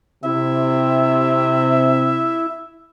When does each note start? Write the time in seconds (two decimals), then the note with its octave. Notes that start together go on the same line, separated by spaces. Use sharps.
0.24 C3 E4 E5